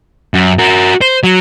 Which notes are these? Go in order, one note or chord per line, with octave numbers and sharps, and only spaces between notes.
F#2
F#4 A#4
C5
F#3